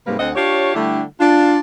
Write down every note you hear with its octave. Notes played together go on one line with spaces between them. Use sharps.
G#2 C3 G3 A3 A#3 B4
D2 C4 D#5 F#5
D4 F4 G4 C#5
D3 G3 A3 D4 E4 G4
D4 F4